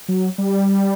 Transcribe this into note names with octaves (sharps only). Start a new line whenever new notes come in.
F#3
G3